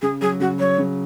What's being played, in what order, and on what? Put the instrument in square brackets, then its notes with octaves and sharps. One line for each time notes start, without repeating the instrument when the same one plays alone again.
[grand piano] C#3 [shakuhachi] G#4
[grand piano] F#3 [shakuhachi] G#4
[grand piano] C#3 [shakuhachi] F#4
[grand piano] F#3 [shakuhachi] C#5
[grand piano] C#3